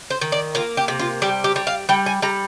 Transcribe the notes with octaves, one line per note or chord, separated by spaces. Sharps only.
C5
D#3
D5
A#3 F4
G4
C3
F4
G3 G4
G4
G3
F5
G3 G5
G#5
G3 A#5